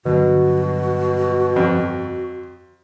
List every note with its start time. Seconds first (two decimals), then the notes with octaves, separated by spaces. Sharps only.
0.05 G2 B2 D3 F#3 F#4
1.56 F2